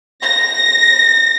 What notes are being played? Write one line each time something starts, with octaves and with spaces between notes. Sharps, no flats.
A#6